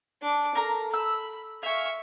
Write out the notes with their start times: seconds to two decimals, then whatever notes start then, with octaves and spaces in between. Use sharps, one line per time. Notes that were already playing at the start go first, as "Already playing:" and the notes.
0.22 D4 D6
0.55 A4 A#4 A#5
0.94 B5 E6
1.63 E5 F5 G#5 C#6